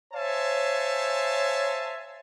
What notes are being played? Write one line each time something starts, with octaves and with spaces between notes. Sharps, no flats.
C5 C#5 E5 F5 G#5 A5